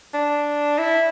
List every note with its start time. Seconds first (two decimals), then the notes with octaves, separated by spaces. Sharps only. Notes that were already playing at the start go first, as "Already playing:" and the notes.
0.14 D4
0.78 E4